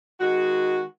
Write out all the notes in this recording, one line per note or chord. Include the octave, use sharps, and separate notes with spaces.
D#3 G#3 F#4